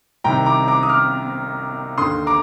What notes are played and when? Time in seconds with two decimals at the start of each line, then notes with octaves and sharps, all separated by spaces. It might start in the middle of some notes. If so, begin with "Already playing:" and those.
0.24 C2 C3 D#3 G5 A#5
0.46 A#5 D6
0.68 A#5 D6
0.83 D#6
0.89 D6 F6
1.98 D#2 D3 C6 D#6
2.27 A#5 D6